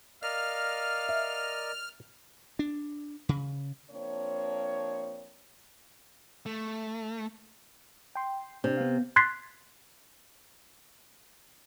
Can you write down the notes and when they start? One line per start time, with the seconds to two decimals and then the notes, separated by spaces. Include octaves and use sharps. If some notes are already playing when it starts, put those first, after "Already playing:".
0.23 A#4 D5 D#5 F5 F6
1.09 E5
2.59 D4
3.29 C#3
3.91 F3 A#3 C4 D4 C#5
6.46 A3
8.15 G5 C6
8.64 C3 D4
8.77 B3 F5
9.16 C6 F#6 G#6 A6 B6 C7